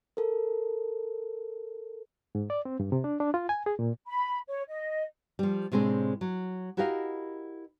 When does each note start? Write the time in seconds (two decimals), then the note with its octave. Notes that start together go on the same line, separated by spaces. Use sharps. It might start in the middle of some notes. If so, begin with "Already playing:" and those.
0.17 A4 A#4
2.35 G#2
2.50 D5
2.65 C4
2.80 G2
2.92 C3
3.04 D4
3.20 D4
3.34 F4
3.49 G#5
3.66 G#4
3.79 A#2
4.07 B5
4.49 C#5
4.68 D#5
5.39 F3 G3
5.72 A2 C3 G#3 C4 D4
6.21 F#3
6.77 E4 F#4 G4 A#4 D#5 F5